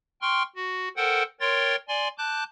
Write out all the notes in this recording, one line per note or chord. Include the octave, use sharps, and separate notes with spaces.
G5 C6 C#6 F6
F#4
A4 A#4 C5 F#5 G5
A#4 C#5 G5 C6 A6
D5 G#5 C6
A5 D6 F#6 G6